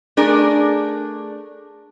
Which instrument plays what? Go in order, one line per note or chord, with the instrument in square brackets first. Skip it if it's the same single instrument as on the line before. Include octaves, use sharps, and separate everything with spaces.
[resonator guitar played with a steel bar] A3 D4 G#4 A#4